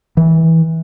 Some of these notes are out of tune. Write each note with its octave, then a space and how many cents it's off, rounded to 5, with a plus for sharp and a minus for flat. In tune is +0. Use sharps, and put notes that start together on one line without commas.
E3 -20